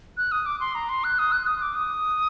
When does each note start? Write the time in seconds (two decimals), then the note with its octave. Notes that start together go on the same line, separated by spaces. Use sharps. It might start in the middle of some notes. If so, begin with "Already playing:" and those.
0.17 F#6
0.32 D#6
0.46 D6
0.60 C6
0.75 A#5
0.89 C6
1.04 F#6
1.19 D#6
1.32 F#6
1.47 D#6
1.62 D6
1.75 D#6